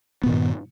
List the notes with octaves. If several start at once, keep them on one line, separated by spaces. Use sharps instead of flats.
G2 A#2 D#3 B3